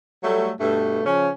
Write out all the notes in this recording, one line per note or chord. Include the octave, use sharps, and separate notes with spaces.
F#3 G3 A3
G2 B2 A3
C#3 F3 C#4